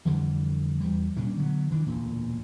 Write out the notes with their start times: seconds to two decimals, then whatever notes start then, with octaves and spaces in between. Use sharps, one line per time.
0.05 F2 D3 E3 G3
0.80 E2 G3
1.16 A#2 G3 C#4 D4
1.36 D3 F#3 B3
1.70 D#3 E3 D4
1.86 E1 D2 A#2